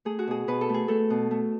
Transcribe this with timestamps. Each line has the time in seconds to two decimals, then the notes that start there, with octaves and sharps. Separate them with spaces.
0.05 A3 G#4
0.19 F#4
0.27 B2 G#4
0.48 B2 B4
0.61 A4
0.69 A3 G#4
0.88 A3 A4
1.10 B2
1.31 A3